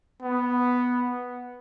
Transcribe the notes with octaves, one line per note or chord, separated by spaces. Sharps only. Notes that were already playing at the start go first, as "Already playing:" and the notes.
B3